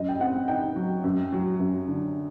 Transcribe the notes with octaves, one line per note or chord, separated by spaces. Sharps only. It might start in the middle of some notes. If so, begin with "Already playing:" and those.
Already playing: F#2 D#5
G5
C4 F#5
D#4 G5
F#3
F#2
F#3
F#2
D3